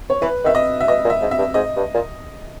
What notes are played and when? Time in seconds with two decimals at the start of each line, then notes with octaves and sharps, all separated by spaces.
0.10 C#5
0.21 E3 B4
0.44 D#3 E5
0.55 D#5
0.80 E5
0.87 B2 D#5
1.04 A#2
1.10 E5
1.21 G#2
1.31 E5
1.38 G2
1.54 G#2 D#5
1.76 G2
1.94 A#2